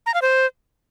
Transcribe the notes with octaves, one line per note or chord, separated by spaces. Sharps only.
A#5
F5
C5